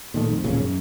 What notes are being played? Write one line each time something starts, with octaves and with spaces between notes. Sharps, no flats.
A#2 D#3 A3
F2
E1 D#2 A#2 C#3
F#2